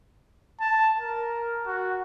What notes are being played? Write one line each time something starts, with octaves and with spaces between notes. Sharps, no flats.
A5
A#4
F#4